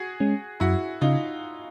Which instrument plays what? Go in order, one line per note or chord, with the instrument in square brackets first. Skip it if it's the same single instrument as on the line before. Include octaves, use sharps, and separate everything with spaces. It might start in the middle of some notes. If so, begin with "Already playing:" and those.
Already playing: [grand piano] F#4 G#4
[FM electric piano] G#3 C#4
[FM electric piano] F#2 [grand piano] E4 F#4
[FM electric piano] C#3 [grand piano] D#4 F4